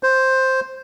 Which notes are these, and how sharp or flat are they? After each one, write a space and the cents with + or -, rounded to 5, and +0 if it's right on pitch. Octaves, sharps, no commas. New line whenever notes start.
C5 +5